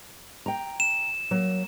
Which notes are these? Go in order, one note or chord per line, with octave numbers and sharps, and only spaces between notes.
G5 A#5
E7
F#3 A#3